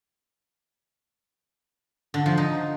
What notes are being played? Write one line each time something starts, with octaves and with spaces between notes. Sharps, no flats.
D3
F3
D#4